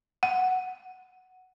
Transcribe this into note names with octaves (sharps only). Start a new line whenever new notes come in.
F#5